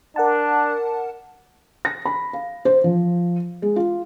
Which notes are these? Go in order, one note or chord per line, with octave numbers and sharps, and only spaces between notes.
D4 A#4 F#5 A5
A#6
B5
F5
C5
F3
G#3
F4